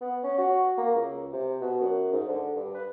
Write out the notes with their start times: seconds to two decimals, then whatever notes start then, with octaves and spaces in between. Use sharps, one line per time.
0.01 B3
0.23 C#4
0.38 F#4
0.77 A#3
0.95 C#2
1.33 C3
1.61 B2
1.81 F#2
2.12 G#2
2.28 D3
2.56 G2
2.74 B4